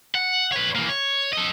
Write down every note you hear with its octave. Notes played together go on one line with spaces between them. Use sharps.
F#5
B4 C#5
E3 A#3
C#5
A4 D#5